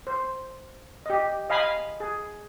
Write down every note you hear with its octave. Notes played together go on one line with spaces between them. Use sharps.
C5
G4 D#5
D#5 F5 G#5 B5 D#6
G#4